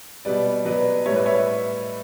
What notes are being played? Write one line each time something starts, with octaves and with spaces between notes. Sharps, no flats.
B2 G3 B4 D5
B2 F#3 B4 D5
A2 G3 C#5 E5
B4 D5
C#5 E5